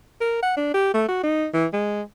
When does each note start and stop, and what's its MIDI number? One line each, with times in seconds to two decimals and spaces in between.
0.21 0.39 70
0.43 0.53 78
0.57 0.74 62
0.74 0.93 67
0.94 1.03 57
1.08 1.21 66
1.23 1.46 63
1.54 1.66 52
1.73 2.02 56